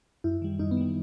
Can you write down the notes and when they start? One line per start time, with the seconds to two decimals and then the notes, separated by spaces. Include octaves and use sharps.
0.24 F#2 E4
0.42 D#3 G3
0.59 F#2 D#4
0.71 B3
0.77 D#3 G3